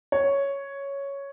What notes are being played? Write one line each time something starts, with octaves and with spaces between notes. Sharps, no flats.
C#5